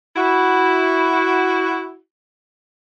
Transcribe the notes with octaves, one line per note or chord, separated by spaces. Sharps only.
E4 F#4